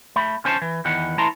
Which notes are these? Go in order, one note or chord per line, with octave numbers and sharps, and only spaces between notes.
A3 B5
D3 C#4 C5 G#5 A5
E3
E2 D#3 E3 F#5
E3 A3 E4 A5 A#5 C6